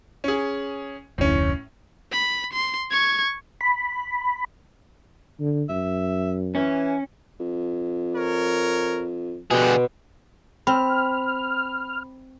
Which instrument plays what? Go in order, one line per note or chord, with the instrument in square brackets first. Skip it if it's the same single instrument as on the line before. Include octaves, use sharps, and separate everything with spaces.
[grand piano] C#4 G#4
[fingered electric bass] F1 D2 [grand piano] A2 C#4
[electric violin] B5
C6
C#6 G#6
[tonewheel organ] B5
[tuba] D3
[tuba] F#2 [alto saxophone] E5
[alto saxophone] E3 [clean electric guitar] C#4
[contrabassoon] F2
[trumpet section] A#4 C#5
[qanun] B2 C6 [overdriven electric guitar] D3 G#4 [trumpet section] G4 F#5
[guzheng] C4 [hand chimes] B5 [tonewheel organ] F6